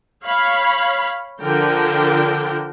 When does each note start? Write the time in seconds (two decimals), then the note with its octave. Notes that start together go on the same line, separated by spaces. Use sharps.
0.24 C#5 F5 B5
1.41 D3 F3 D4 A#4 G5